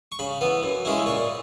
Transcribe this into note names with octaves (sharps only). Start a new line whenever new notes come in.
C#6
C#3 B5
E3 B3
F#2
C#3 G#3 C#4 E4
A#2 C#6